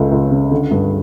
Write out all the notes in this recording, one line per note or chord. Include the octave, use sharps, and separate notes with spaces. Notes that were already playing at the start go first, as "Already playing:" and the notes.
Already playing: C#2 A3
C#2
C#3
D3
G2